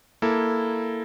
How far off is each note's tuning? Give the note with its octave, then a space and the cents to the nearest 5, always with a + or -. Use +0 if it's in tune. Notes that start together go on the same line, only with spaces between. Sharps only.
A#3 +0 E4 +0 A4 +0